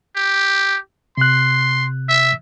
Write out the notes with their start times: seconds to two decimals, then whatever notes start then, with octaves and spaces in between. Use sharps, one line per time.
0.16 G4
1.17 C3 C6 F#6
2.09 E5